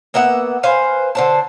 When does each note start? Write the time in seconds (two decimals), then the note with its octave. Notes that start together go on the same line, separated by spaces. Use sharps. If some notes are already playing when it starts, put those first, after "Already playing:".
0.14 A#3 B3 E5 F#5
0.63 B4 C5 F5 G#5
1.15 D3 C5 A5